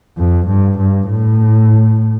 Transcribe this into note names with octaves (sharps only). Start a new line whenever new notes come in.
F2
G2
G2
A2